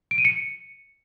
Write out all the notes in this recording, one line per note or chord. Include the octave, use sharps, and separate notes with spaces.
D7
D#7
C#7